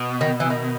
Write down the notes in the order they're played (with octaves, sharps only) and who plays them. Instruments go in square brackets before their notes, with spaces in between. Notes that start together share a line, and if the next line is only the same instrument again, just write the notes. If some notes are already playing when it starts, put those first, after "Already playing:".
Already playing: [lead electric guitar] B2
[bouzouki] D#3
E3
D#3